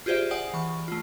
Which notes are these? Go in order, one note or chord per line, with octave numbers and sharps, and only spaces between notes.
F4 G4 G#4 C5 D5 E5
D5 F#5 G#5 D#6
E3 C#6
A3 F4